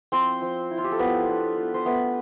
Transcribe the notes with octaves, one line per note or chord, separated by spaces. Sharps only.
F3 C4 C5
F3
E4
F4
G4
A4
F3 B3 B4
D4
F4
C5
A3 B3 B4